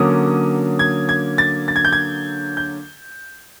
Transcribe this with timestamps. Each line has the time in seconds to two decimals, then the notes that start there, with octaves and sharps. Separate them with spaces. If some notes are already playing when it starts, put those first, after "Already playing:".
Already playing: D3 F#3 A#3 C#4 D#6
0.79 G#6
1.09 G#6
1.38 A6
1.68 A6
1.76 G#6
1.85 G6
1.93 G#6
2.57 G6